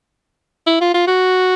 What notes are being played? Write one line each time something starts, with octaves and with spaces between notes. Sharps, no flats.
E4
F4
F4
F#4